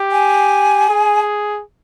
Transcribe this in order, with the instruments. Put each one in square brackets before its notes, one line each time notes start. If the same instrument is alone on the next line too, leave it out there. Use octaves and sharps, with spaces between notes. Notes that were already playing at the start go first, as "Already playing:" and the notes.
Already playing: [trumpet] G4
[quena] G#5
[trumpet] G#4